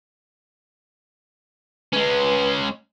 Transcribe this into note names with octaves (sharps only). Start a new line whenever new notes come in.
G#3 C#4 B4